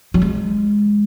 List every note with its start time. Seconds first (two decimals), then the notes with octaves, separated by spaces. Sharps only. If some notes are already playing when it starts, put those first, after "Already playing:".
0.14 F#3
0.22 G#3